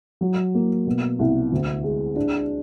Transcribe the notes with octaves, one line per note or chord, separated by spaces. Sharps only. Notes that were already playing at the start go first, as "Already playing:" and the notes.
F#3
A#3
B2
C2
D2
G#3
D4